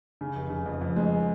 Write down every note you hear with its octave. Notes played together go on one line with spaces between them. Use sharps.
C#3
F1
C#3
F2
F2
G#3